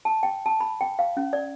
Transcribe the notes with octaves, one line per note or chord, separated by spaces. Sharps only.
A5
G5
A5
B5
G5
F5
C#4
D5